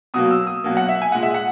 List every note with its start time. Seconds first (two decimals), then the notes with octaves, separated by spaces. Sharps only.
0.14 B2 F#3 A#3 D#6
0.31 E6
0.47 D#6
0.64 B2 F#3 A#3
0.77 F#5
0.89 E5
1.02 G#5
1.12 A#2 G#3 F#5
1.23 E5
1.34 F#5